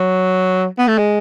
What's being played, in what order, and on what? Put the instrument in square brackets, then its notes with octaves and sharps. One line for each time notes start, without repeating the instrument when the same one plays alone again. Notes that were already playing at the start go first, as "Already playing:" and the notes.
Already playing: [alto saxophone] F#3
B3
A3
G#3